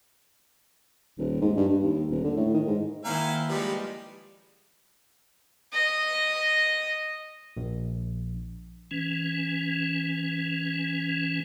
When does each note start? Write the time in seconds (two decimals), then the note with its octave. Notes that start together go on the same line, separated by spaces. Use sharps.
1.18 D#1
1.41 G#2
1.57 G2
1.69 G2
1.83 D#2
2.10 D#1
2.24 D3
2.37 A2
2.54 D#3
2.67 G#2
3.05 D#3 A#3 E4 C5 F5 F#5 G#5 A#5
3.49 F3 G3 G#3 D#4 G4 B4
5.73 D#5
7.57 A#1
8.91 E3 C#4